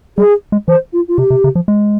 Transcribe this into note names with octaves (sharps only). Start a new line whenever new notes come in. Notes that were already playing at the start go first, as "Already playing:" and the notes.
G3 G#4
G#3
E3 C5
F4
F4
C3 G4
C3
C#3
F3
G#3